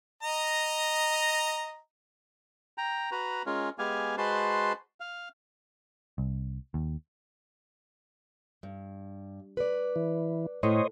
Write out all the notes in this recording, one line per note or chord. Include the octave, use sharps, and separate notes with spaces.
D#5 A#5
G5 A#5
F#4 B4 A#5
G#3 C#4 F4 A#4
G#3 B3 G4 F5 G#5
G#3 F#4 B4 C5 A5 C6
F5
C2
D#2
G2
B4 D5
E3
A2 C5 C#5 D#5